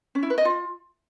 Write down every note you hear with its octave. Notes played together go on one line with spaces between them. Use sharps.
C#4
E4
B4
D#5
F4